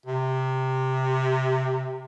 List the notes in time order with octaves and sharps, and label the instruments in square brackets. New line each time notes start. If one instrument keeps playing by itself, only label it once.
[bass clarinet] C3